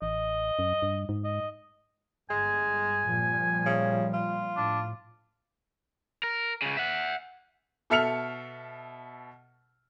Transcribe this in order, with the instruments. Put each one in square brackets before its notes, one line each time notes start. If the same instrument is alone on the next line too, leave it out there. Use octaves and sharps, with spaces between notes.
[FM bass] A1 [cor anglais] D#5
[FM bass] F#2
G2
G#2
[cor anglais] D#5
[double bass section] G1 [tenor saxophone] G#3 [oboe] G#5
[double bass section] A#2 F3 G3
[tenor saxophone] C#3
F4
[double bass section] A2 [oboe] D4
[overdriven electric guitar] A#4
C#2 C#3
E5 F#5
[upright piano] B2 A4 E5 F6 C#7 F7